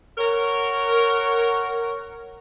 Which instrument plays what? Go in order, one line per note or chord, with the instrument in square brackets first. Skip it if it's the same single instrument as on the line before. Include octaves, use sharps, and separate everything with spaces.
[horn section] A#4 C#5 F#5